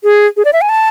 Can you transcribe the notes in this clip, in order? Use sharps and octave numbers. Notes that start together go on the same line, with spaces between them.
G#4
G#4
D5
E5
G#5
A5